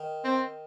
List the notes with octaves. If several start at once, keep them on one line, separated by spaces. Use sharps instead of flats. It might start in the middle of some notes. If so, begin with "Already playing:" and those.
Already playing: D#3
C4